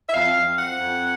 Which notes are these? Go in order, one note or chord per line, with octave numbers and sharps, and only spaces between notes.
E5
F2 F5
F2
F3 F#5
F2